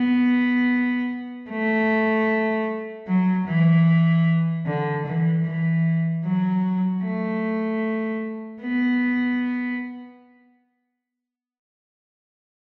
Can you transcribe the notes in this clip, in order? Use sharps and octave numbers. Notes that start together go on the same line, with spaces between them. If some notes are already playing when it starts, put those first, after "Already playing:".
Already playing: B3
A3
F#3
E3
D3
E3
E3
F#3
A3
B3